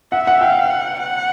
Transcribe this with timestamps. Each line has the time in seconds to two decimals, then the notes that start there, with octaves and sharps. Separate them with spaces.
0.12 E5 F#5
0.27 F#5
0.41 F5 G5
0.70 F#5
0.99 F#5